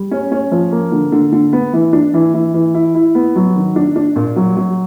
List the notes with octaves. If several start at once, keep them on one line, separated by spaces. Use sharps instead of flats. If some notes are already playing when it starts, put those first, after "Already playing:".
Already playing: G3
C#4
C#4
F3
A#3
D3
D3
D3
B3
E3
D4
E3
E3
E3
E4
E4
B3
F#3
D#3
D4
D4
A#2
F#3
F#3